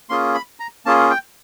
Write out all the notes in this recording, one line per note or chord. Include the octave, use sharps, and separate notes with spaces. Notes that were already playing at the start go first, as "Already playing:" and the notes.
A#3 C#4 F4 G#4 C6
B5
A#5
A#3 C#4 F4 G#4 A5
G5